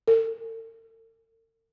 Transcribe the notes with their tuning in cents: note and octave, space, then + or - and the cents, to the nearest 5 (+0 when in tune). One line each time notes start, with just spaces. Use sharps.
A4 +45